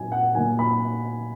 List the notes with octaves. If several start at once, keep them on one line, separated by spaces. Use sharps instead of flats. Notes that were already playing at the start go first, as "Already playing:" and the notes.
Already playing: A#2 F#3 A#3 D#4 G#5
F#5
A#2 F#3 A#3 D#4 G#5
B5